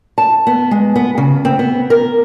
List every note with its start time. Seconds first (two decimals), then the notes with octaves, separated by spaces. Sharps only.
0.18 A5
0.47 B3
0.71 G#3
0.96 B3
1.18 C#3
1.45 C4
1.59 B3
1.90 A#4